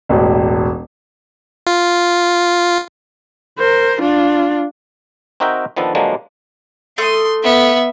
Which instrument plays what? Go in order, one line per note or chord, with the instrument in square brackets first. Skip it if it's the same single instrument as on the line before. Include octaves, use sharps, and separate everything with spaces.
[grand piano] E1 A1
[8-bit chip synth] F4
[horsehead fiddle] A#4 C5
D4 F4
[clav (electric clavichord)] C4 D#4 F#4 A#4 E5 G5
D#3 F3 B3 D4 A4
D3 F3 F#3 G#3 A#3 D4
[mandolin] A3 D#6 [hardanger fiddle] C6
[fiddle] B3 [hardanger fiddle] E5